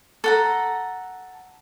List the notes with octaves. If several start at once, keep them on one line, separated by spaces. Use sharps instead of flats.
A4 F#5 A#5